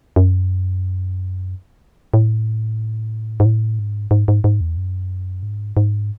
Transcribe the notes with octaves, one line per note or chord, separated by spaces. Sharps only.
F#2
A2
G#2
A2
G#2
G#2
G#2
G#2
E2
F#2
G#2
G#2